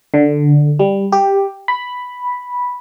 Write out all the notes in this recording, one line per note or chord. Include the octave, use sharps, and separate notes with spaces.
D3
G3
G4
B5